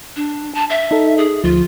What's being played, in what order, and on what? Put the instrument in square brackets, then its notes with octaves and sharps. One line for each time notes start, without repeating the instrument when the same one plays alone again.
[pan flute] D4
A5
E5
[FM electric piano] D#4 A4
[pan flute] G#4
[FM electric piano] D2 F3 [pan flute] F4